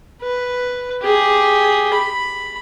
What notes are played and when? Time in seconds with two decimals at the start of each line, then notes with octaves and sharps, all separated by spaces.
0.22 B4
1.02 G4 G#4
1.94 B5